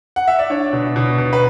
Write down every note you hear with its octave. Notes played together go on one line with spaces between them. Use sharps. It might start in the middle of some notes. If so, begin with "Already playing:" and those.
F#5
E5
D5
D4 C#5
B2
B2
B2
B4